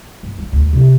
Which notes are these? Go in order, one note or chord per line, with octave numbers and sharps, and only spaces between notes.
G2
G3
D2
C3 D4